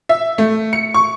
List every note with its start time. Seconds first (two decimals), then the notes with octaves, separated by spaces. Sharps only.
0.09 E5
0.38 A3
0.73 C#7
0.94 C#6